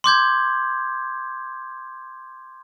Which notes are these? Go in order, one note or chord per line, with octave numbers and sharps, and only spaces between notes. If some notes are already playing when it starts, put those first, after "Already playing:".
C6 D6 G6 G#6